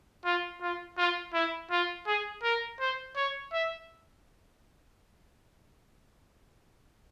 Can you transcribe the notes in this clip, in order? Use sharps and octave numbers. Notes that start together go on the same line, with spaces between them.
F4
F4
F4
E4
F4
G#4
A#4
C5
C#5
E5